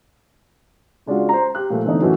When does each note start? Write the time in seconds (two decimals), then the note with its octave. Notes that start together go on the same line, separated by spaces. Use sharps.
1.06 C#3 G#3 D4 F4 F#4
1.29 C5 A#5
1.55 G4 F#6
1.70 A#2 F3 A3
1.85 D3 E3 A3 B3 C4 D#4
2.01 F#2 A2 E3 F#3 A3 F#4